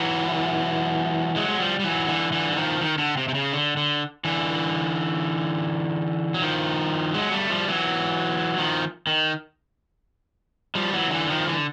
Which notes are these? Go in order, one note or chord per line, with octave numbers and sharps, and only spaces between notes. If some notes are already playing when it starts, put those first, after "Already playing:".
Already playing: E3 F#3
F#3 G#3
G#3
F3 G3
G3
E3 F#3
D3 E3
D3 E3
E3
D#3 F3
D#3
D3
C3
C3
C#3
D3
D3
D3 E3
F#3
D#3 F3
F#3 G#3
G3 A3
F3 G3
E3 F#3
D#3 F3
D#3
F3 G3
E3 F#3
D3 E3
D#3 F3
D3 E3